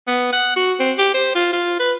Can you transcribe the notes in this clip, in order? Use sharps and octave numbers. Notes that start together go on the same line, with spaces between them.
B3
F#5
F#4
C4
G4
C5
F4
F4
B4